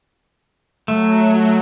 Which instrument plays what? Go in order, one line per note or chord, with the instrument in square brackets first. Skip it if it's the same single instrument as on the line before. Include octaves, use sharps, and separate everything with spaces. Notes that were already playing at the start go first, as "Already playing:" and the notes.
[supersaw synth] F#3 [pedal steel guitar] A3